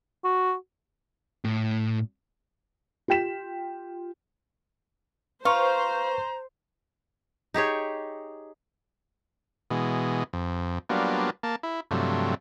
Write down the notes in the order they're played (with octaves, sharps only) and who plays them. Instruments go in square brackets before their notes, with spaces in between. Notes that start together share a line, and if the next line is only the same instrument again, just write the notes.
[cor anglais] F#4
[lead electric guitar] A2
[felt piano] F4 G4 G5 B6 E7
[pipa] F4 [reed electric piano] B4 C#6 [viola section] C5 [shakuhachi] A#5
[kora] D#4 G4 G#4 C#5
[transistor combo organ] B2 E3 G#3
F2
F#3 G3 A#3 B3 D4 F4
A#3 A5
E4
G2 C3 F3 F#3 A3